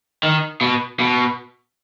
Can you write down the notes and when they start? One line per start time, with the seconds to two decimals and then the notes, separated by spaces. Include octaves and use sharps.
0.23 D#3
0.61 B2
1.00 B2